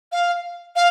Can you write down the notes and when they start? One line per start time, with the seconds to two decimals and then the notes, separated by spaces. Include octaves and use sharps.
0.12 F5
0.76 F5